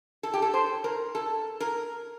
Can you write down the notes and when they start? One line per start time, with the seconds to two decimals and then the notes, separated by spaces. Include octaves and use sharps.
0.23 A4
0.34 G4
0.42 A4
0.54 C5
0.84 A#4
1.15 A4
1.60 A#4